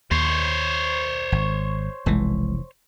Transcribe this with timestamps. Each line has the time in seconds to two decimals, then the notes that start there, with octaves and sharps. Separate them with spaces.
0.11 D#2 C5 C#5
1.32 G#1
2.06 F1 B1 E3 G#3